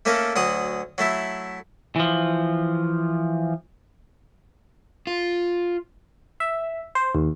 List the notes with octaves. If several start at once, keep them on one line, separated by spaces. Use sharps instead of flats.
A3 A#3 C#4 A4 A#4
D2 F#3 F#5 D#6
F#3 A3 E4
E3 F3
F4
E5
C5
D#2